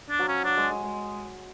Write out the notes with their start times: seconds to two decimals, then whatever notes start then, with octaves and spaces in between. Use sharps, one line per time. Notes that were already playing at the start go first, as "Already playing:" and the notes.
0.10 D4
0.19 F#3
0.28 C#4
0.45 F#3 D4
0.57 G#3
0.70 G#3
0.83 G#3